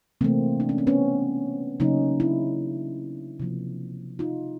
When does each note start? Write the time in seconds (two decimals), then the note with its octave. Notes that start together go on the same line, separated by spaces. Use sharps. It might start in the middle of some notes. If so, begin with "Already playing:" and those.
0.21 C3 E3 A3 A#3 C4
0.60 D4
0.69 C#4
0.78 C4
0.87 B3 C#4
1.80 C#3 F#3 A#3 C#4 D#4
2.20 D4 E4
3.40 C3 F3 A#3
4.19 D#4 F4